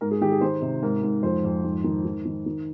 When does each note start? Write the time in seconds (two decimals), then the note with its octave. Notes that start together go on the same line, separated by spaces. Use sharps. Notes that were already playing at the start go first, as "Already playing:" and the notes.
0.01 G#2 A#4
0.11 G#4
0.21 D#3 G4
0.31 G#4
0.41 D#3 C5
0.62 C3
0.82 G#2 A#4
1.03 G#2
1.23 F2 C5
1.44 F2
1.64 G#2
1.84 D#3
2.05 D#3
2.26 D#3
2.46 D#3